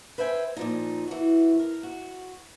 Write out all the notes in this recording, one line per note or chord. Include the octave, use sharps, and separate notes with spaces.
B4 C5 E5 G5 G#5
A#2 F3 D#4
E3 F#4
A#4
F#4